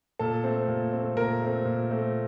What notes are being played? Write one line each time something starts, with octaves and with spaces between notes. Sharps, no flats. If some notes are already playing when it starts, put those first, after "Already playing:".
A#2 A4
A3 C4
A#2
A3 C4
A#2 A#4
A3 C4
A#2
A3 C4